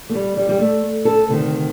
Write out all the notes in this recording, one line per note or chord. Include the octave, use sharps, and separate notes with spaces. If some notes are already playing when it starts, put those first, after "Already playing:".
A3
G3
G3
G3
A3
A4
D2 C3 D#3